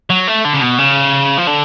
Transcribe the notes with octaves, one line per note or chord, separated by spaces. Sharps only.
F#3
A3
D3
C#3
B2
C#3
F3
D3